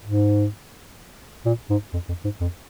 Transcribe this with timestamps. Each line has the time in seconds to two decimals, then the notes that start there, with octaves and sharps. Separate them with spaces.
0.04 G#2
1.45 A#2
1.70 G#2
1.93 F2
2.09 F2
2.24 G#2
2.40 F2